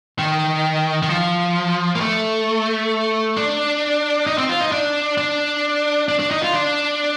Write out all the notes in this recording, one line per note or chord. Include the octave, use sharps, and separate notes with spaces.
D#3
D#3
F3
A#3
A3
D4
D#4
C4
F4
D#4
D4
D4
D4
D4
D#4
F4
D4